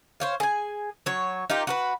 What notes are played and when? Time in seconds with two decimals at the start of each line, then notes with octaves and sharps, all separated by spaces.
0.20 C5 C#5 F5
0.40 G#4 G#5
1.06 F#3 C#5
1.50 D#4 F4 G4 A#4
1.67 F#4 A#4 B4